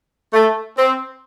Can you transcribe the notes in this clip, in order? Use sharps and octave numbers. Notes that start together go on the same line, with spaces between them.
A3
C4